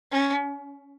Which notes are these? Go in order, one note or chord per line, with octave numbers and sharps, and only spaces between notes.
C#4